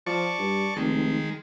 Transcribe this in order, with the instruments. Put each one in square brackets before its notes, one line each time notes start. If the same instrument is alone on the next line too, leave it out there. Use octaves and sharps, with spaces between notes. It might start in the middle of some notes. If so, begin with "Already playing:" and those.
[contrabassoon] F3 [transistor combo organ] D5 A5 C#6
[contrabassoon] G2
[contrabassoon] F1 [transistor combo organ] D#3 G#3